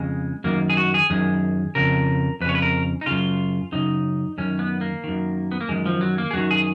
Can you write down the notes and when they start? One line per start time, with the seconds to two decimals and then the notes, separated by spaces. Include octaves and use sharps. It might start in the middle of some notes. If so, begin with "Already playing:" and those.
Already playing: F2 C#3 G#3
0.44 F#2 D#3 A#3
0.70 G#4
0.77 F#4
0.94 G#4
1.10 F#2 D#3 G#4
1.75 F2 C#3 A#4
2.41 F2 B4
2.45 C#3 C#5
2.55 B4
2.62 A#4
3.01 D#4
3.06 F#2 C#3 F4
3.72 F#2 C#3 D#4
4.38 F#2 D#3 C#4
4.59 B3
4.81 A#3
5.04 F#2 D#3
5.51 B3
5.61 A#3
5.69 F#2 D#3 G#3
5.86 F3
6.01 F#3
6.18 A#3
6.31 G#4
6.34 F#2 D#3 F#4
6.51 G#4